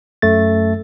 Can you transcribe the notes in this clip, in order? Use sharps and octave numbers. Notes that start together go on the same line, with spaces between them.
F#2 A3 A6